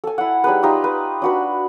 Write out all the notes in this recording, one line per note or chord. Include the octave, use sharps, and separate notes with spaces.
A4 G#5
E4 F#5
G3 D#4 G#4 B4
D#4 F4 G4
B4
D4 F#4 B4